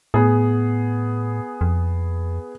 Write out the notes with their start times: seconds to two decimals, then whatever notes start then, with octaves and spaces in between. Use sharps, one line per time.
0.14 A2 B3 G#4
1.61 F2